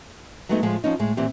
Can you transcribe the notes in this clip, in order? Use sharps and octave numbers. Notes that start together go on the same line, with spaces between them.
F#3 G#3 A3 B3 C4 D#4
A2 F3 G#3
F3 C#4 D#4
A2 G#3
A#2 E3 C4 G4